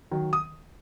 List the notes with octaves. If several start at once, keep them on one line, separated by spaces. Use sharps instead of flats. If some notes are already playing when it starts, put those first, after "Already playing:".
D#3 F#3
D#6